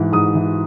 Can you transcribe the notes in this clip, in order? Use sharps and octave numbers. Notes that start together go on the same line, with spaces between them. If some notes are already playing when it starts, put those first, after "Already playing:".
Already playing: G#2 E3
G#2 D#6
E3